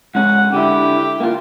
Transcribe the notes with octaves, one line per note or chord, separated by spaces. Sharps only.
G#2 C#4 F#5
D3 E4 G4
A#3 F4